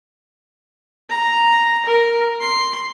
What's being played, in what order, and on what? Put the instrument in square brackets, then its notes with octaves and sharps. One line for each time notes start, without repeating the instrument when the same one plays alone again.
[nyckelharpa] A#5
A#4
C6